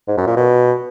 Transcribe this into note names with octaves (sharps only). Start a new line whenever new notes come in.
G#2
F#2
A#2
B2